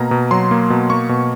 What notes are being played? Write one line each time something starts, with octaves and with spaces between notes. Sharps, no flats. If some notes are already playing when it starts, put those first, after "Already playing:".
Already playing: B2 A#3 A#5
B2
F#3 C6
A#3
B2
A#3 C#6
B2